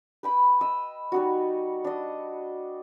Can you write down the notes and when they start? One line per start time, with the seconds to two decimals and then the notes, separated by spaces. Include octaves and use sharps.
0.23 B4 G5 B5
0.61 D#5 E6
1.12 G3 D#4 F#4
1.84 D4 D#5